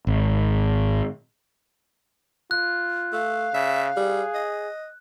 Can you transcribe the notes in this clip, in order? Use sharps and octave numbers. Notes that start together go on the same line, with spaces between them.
G#1
F4 F#6
A3 F5
C#3 E5
G3 G#4
D#5